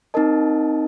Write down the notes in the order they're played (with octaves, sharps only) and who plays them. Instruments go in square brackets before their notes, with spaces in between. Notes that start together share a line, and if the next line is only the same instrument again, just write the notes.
[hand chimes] C4 D#4 A#4 D#5 A5